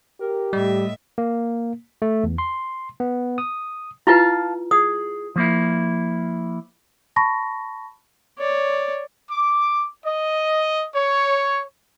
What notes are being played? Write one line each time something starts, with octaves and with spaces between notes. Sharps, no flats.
G4 A#4
A2 G3 D#5 E5
A#3
A3
E2
C6
B3
D#6
E4 F4 B4 F5 A5
G#4 D#6
F3 A#3 E4
A5 B5 C#6 A#6
C#5 D5
D6
D#5
C#5